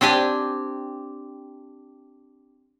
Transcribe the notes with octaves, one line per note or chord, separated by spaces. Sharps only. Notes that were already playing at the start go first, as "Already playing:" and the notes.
C4 D4 G4 G#5